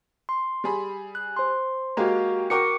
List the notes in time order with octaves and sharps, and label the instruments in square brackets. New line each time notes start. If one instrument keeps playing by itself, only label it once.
[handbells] C6
[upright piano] G3 G#4 B5
[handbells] F#6
C5 C6
[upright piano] G#3 A#3 G4 [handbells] F#4 F5 A#5
[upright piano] F#4 A#4 G5 [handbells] C#6 D6 C#7